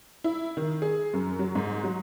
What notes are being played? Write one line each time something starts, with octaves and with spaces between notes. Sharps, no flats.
E4
D#3
G#4
F#2
F#3
G#2
F#3